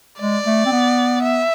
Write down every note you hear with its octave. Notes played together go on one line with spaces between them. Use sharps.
G#3 D5
A3
C4
B3
E5